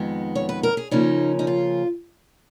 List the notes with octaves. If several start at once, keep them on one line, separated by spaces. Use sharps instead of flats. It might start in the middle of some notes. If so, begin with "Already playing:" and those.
Already playing: F2 D#3 G#3 B3
C#5
B4
A#4
G#4
C#3 F3 A#3 C#4 D#4
D#4
F4